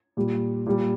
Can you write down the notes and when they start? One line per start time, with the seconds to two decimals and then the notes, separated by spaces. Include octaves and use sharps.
0.17 A#2 G3
0.66 A#2 G3